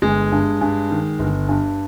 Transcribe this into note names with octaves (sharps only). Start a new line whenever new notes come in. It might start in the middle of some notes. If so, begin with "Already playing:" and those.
G1 G#3
G2
G2
D#3
G1
G2